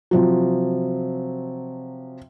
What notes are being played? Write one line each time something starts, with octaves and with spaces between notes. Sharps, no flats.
C3 F3 F#3